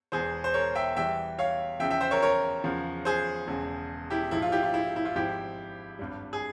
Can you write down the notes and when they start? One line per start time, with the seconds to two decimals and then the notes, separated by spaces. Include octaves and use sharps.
0.12 E1 E2 E3 G#4 C5
0.44 C5
0.54 A#4 C#5
0.75 E5 G5
0.96 E2 E3 G3 E5 G5
1.38 C#5 F5
1.80 E2 C#3 F3 E5 G5
1.90 E5 G5
2.01 C5 E5
2.11 A#4 C#5
2.22 A#4 C#5
2.64 E2 C#3 F3
3.05 G#4 C5
3.48 E1 E2 C#3
4.10 E4 G4
4.31 A#1 G#2 F3 E4
4.42 F4
4.52 E4 G4
4.63 F4
4.74 E4
4.96 E4
5.05 F4
5.15 G#1 G#2 F3 E4 G4
5.99 G#1 G2 G3
6.33 G#4